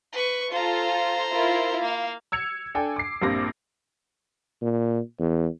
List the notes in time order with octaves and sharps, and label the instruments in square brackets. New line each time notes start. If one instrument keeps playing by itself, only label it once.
[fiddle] B4 C#6
[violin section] F4 A4 [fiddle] C5 A#5
[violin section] E4 F4 A#4
[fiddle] A#3 [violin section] F5
[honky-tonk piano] E6 G#6 C#7 F7
D4 A4 G5 G#5
D6 C7
A#1 G2 A#3 C4 D6 A#6
[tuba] A#2
E2